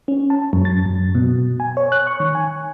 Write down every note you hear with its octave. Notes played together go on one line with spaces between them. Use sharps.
C#4
A5
F#2
A6
F#2
B2
G#5
C#5
F#6
C#6
D#3
G#5